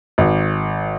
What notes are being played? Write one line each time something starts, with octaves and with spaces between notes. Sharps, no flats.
G#1